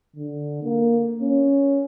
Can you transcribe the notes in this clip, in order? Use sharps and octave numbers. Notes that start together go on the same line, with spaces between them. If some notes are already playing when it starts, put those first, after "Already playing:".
D3
A#3
C#4